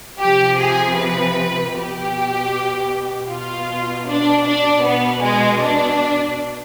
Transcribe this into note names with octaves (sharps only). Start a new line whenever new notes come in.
C3 F3 G4
G#4
B4
B2 G4
B2 F4
D4
D4
B2 B3
G#3
D4